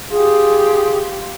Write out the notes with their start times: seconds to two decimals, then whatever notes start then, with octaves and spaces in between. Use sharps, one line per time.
0.11 F4 G4 G#4